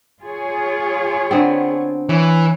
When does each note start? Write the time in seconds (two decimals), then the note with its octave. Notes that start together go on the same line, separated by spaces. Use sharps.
0.21 F4 G#4 C#5
1.31 D3 B3 C4
2.09 E3 C#5